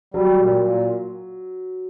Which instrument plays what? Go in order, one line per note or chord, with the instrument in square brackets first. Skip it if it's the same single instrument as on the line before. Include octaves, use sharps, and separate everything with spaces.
[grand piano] F#3 [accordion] G3
[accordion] A#2
A#2